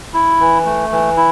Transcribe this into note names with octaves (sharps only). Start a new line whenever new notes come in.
E4
E3
A3
E3
E4